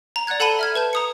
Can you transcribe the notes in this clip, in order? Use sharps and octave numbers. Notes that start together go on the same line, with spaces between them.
A#5
D5 F#5 A#5 F#6 G#6
A4 F#5 A5 B5 D#7 G7
E5 F6 G#6
B4 A5 G6
A#5 D#6 C#7